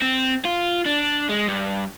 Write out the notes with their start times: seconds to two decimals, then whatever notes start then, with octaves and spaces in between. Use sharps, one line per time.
0.02 C4
0.45 F4
0.86 D4
1.29 G#3
1.48 G2